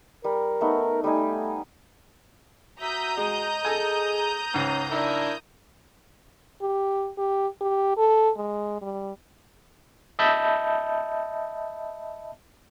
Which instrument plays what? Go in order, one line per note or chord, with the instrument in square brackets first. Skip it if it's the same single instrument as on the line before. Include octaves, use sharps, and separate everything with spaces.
[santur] G3 [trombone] A#4
[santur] A3 B3 D#4
[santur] G3 D#4 G#5 [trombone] A3
[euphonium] F#4 [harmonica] E5 [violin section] A#5 D#6 G6
[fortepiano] G#3 [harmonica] D#5
[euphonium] G#4 [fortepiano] A4 G#5
[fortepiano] C#2 G#2 [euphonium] C#4
[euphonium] D4 [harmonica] E4 A#4 E5
[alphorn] G4
G4
G4
A4
G#3
G3
[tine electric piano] D#5 E5 A5 B5 G6